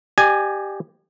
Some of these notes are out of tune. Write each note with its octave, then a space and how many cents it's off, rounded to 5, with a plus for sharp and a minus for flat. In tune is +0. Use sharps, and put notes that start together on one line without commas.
G4 +0 D5 +45 G#5 +0